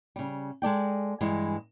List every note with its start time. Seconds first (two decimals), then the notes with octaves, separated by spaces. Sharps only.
0.16 C#3 G3
0.62 G#3 A4 D5 G5
1.21 G2 E3 G#3